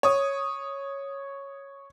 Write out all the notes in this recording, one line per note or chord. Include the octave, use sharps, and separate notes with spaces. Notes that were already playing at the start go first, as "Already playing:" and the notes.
C#5 D#6